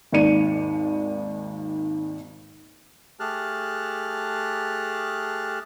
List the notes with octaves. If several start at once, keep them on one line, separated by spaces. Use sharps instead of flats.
G#1 D#2 D#3 D5 C#7 D#7
A3 G4 G#4 A5 F6 F#6